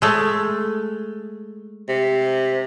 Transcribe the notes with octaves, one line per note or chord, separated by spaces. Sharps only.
G#3 A3
C3